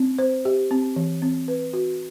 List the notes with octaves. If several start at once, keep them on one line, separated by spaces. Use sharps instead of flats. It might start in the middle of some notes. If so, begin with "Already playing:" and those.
Already playing: C4
C5
G4
C4
E3
C4
B4
F#4